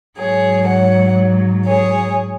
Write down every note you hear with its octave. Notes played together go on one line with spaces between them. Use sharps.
G#2 F#3 G#4 C#5
C#5 F#5
G#4 C#5